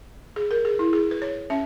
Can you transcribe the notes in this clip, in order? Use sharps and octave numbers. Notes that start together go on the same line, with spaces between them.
G#4
A#4
G#4
E4
G#4
B4
C#5
C#4 E5